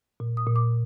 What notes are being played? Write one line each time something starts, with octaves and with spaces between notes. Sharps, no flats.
A#2
D#6
A#2
D6